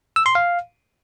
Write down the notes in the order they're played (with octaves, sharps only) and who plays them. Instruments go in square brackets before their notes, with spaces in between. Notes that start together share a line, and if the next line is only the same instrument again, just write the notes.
[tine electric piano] E6
C6
F5